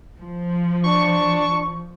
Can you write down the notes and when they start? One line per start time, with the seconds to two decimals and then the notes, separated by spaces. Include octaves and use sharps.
0.19 F3
0.84 D4 C#6